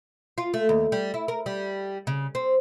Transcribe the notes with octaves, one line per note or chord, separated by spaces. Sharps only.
F4
A3
D#2
G3
E4
A#4
G3
C#3
C4